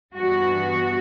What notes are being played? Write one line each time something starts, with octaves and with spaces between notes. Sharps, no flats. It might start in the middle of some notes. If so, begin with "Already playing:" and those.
G2 E3 B3 F#4